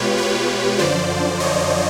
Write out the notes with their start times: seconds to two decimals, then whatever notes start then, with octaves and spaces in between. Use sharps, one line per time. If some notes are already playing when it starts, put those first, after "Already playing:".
Already playing: B2 G#3 F4 G4 B4 C#5
0.18 B4 C#5
0.79 F#2 D3 F3 C5 D5
1.40 C#5 D#5